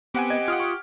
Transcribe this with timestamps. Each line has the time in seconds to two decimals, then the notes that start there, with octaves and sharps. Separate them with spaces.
0.14 B3 C4 G4 F#5 G#5
0.30 D#5 G#6
0.48 F4 F#5 D#6 F6
0.60 C#6